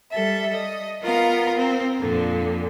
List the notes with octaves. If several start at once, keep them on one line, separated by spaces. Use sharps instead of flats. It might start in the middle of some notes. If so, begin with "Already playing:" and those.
G3 A4 E5
D#5
B3 F4 A#4 F5 A#5
C4
F2 A#2 D3